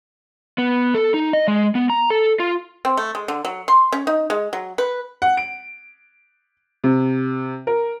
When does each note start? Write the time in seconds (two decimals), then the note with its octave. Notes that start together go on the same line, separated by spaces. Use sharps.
0.58 B3
0.94 A4
1.14 D#4
1.33 D#5
1.48 G#3
1.75 B3
1.90 A#5
2.10 A4
2.40 F4
2.85 C4
2.97 A3
3.15 G#3
3.28 D3
3.45 F#3
3.68 C6
3.92 C#4
4.07 D#4
4.30 G#3
4.53 F#3
4.78 B4
5.22 F#5
5.37 D7
6.84 C3
7.67 A#4